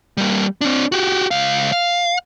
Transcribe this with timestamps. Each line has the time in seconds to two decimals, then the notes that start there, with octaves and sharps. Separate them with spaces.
0.17 G3 A#3
0.61 C4 D4
0.92 F#4 G4
1.31 C#2 F5
1.72 F5